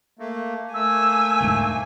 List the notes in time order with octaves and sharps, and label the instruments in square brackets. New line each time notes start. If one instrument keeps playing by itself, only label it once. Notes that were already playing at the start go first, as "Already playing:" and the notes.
[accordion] A3 A#3
[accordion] A3 A#3 [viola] G#5 [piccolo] E6
[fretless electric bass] E1 D2 G#2